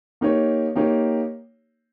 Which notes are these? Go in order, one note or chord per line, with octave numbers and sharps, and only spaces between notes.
A#3 D#4 G4 C#5
A#3 D#4 G4 C#5